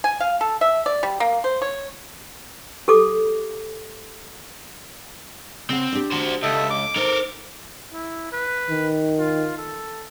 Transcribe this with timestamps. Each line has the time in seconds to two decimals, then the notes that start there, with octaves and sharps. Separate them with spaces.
0.04 G#5
0.20 F5
0.41 A4
0.61 E5
0.86 D5
1.03 G3
1.20 A#3
1.44 C5
1.62 C#5
2.88 G4 A4 D6
5.69 C#3 C4 F#5
5.93 D4 G4
6.12 F#4 C5
6.43 C#2 A4 D#5 E5
6.71 D6
6.96 D#4 A4 A#4 C5
7.93 E4
8.32 B4
8.70 D#3
9.19 F4
9.58 A4